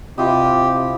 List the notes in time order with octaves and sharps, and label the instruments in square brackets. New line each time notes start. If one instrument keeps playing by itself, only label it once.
[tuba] C3 [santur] E4 F4 D#5 [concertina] G4